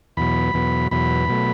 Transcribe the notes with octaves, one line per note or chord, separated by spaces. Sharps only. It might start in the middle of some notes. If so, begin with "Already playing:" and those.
E2 B2 F#3 B5
E2 B2 F#3
E2 B2 F#3 B5
B2 F#3 A3